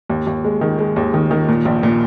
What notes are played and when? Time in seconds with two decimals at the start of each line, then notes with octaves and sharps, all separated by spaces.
0.09 D#2
0.27 D#2
0.44 G#3
0.61 D#3
0.79 G#3
0.96 D#2
1.14 D#3
1.31 D#3
1.48 A#2
1.65 A#1
1.83 A#2